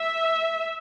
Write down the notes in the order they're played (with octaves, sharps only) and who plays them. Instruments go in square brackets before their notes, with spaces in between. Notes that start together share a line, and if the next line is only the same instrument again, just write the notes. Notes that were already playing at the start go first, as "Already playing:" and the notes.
Already playing: [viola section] E5